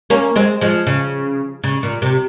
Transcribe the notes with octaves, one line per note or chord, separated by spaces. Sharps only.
A#3 C#4
G#3 C4
F3 G#3
C#3
C#3
A#2
C3